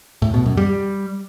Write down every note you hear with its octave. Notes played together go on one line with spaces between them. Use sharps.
A2
B2
F#2
G3